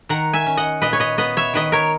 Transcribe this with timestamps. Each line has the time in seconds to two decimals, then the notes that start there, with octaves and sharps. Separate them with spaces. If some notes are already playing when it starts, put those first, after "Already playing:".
0.09 D#3 F#5 A#5
0.33 E5 G#5
0.46 C#4
0.57 D#5 F#5
0.82 A#2 B4 D#5
0.93 C#5
1.00 B4 D#5
1.18 B3 B4 D#5
1.37 C#5 E5
1.54 D#3 B4 D#5
1.72 A#4 C#5